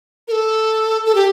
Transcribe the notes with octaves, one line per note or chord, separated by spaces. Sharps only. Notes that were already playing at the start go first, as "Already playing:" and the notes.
A#4
A4
A4
G4